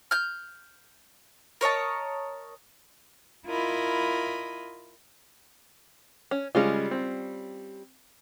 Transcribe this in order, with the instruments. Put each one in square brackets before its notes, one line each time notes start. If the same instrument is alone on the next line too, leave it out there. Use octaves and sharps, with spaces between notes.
[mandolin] F6 G6
A#4 C#5 D#5 A5
[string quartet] E4 F4 A#4 D#5 B5
[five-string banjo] C#4
[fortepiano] C#3 G#3 [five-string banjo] G3 C#4 F4
[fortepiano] C4